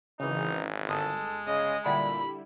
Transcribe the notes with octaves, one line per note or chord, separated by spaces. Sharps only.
G#1 C#3 E3 D#4
G1 G#3 A4 D#6
C#3 D#5
A#2 D3 G3 E4 B5